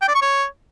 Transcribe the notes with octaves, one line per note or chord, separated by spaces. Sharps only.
G5
D5
C#6
C#5